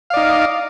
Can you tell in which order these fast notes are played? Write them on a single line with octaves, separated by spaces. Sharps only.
F5 D5 D#4